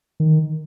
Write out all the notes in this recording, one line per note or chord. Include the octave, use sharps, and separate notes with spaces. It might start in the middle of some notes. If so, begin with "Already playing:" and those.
D#3